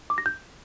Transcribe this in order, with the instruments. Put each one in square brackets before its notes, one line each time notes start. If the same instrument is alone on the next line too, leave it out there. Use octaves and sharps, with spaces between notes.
[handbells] D6
A#6
G6